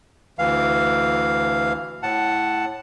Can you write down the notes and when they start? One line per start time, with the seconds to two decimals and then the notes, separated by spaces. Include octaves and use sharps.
0.39 D2 E3 F5
2.03 A2 F#5 A5